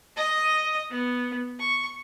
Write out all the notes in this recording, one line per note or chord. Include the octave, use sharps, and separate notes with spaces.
D#5 D#6
B3
C#6